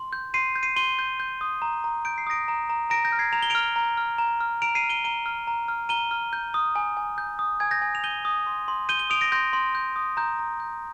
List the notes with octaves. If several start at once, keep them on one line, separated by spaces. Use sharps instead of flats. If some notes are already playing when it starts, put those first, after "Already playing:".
Already playing: C6
G6
C6 C7 D#7
G6
C7 D#7
C6 D#7 G7
G6
G6
D#6
A#5
A#5
G6 D7
C7
D#6 A#6 D7
A#5
A#5
A#5 A#6 D7
G6 A#6
F6
G#6 C7
A#5 F7
G7
F6 D7 F7
A#5
F6
A#5
F6
A#5 D7 F7
C7 D#7
F6
D#7 G7
A#5 D#7 G7
F6
A#5
F6
A#5 D#7 G7
F6
G6
D#6
G#5
G#5
G6
D#6
G#5 G#6
G6 A#6
G#5
F7
G6 D#7 G7
D#6
C6
C6
G6 D#7 G7
D#7 G7
D#6 D7 F7
A#6 D7
C6 G6 A#6
C6
G6
D#6
A#5 G6
A#5
G6